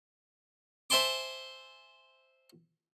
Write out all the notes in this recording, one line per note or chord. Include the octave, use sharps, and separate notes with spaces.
C5 E5 G#5 A5 C6 D6